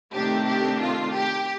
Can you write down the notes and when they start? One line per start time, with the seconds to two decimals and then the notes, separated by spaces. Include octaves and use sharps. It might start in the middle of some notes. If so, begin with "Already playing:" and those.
0.15 C3 D#3 A3 D4 G4
0.48 G4
0.82 F4
1.15 G4